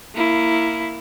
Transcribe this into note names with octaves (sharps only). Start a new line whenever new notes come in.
A#3 E4